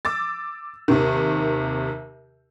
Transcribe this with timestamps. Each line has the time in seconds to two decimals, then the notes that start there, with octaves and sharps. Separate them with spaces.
0.05 D6 E6 A6
0.88 D#2 C3 D#3